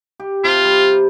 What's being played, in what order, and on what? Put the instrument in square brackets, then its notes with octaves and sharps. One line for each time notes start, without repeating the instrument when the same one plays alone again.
[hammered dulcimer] G4
[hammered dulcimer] C3 [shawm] F4
[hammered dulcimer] G3